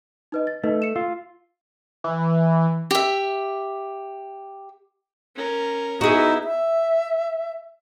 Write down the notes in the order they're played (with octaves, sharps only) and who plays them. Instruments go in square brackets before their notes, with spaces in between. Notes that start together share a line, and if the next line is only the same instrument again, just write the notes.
[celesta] D#4 B4 D#5
A6
[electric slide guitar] A3 [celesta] D#4 B4 D#5
[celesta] C#7 E7
[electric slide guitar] F4 [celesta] E6
[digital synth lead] E3
[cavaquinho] G4 E5
[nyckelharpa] C#4 A#4
[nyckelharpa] B3 E4 [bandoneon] D#4 [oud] F#4 G#4
[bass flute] E5